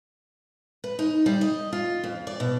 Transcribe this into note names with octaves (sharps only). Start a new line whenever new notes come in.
B4
D#4
G3
D#5
F4
F2
D5
B2